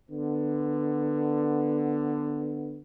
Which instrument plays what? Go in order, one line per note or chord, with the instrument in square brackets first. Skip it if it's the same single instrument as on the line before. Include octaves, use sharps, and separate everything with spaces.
[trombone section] D3 B3